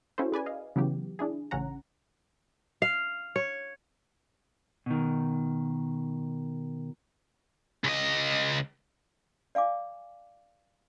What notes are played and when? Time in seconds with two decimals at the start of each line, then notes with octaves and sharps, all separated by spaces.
0.18 C#4 E4 F#4 A4 C5
0.32 G#4 B4 D5 G#5
0.46 D#5 F5
0.76 C#3 E3 F#3 B3 G4
1.19 D4 E4 G#4
1.51 A1 C#3 C#4 F#5 A#5
2.82 F5
3.36 C#5
4.86 B2 D#3
7.84 C#2 D#5
9.55 D5 F5 G#5 D6